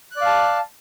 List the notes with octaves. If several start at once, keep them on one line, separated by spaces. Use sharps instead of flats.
D5 F5 A5 F#6